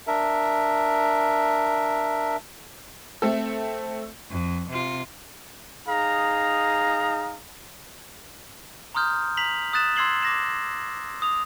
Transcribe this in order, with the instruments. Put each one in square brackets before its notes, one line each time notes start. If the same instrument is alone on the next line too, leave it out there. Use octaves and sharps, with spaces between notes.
[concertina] D4 A#4 E5
[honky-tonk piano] A3 C4 A4
[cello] F2
C3 F4
[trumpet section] D#4 G#4 F5 A#5
[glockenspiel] A#5 C6 D#6 F6 G6
A#5 B6 F7 F#7
D#6 F#6 A6 E7
C6 E6 G#6 C7 F#7 G7
D6 A#6 E7
D#6 F7